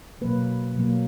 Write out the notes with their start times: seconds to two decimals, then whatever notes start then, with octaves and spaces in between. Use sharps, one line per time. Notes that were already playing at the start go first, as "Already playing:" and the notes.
0.21 B2 F#3 A#3 B4
0.76 B2 F#3 A#3